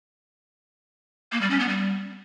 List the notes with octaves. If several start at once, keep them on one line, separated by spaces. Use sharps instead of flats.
A#3
G3
C#4
B3
G3